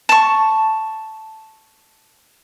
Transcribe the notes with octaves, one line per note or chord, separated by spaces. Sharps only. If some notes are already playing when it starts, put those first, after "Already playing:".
A5 C#6